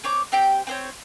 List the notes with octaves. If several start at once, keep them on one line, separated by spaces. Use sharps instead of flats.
C4 C#5 D6
C4 G4 G5
C4 C5 C#5